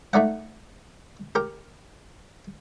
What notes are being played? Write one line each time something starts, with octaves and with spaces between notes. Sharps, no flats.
A3 D#4 D5 F#5
G4 A#4